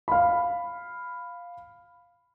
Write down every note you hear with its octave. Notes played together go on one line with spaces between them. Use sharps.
F5 B5